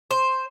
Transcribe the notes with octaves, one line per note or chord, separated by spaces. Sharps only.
C5